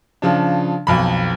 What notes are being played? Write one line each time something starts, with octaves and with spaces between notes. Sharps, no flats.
C#3 F3 D4
B1 F2 B5